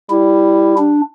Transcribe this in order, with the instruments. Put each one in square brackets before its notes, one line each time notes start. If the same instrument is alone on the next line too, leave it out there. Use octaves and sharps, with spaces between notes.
[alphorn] G3 [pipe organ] E4
[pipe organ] D4